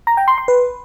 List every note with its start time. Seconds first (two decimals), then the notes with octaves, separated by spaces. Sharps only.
0.07 A#5
0.17 G5
0.28 C6
0.38 C6
0.48 B4